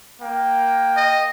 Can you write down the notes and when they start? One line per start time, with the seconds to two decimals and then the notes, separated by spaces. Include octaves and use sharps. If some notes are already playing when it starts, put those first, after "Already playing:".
0.21 A#3 G5
0.97 D#5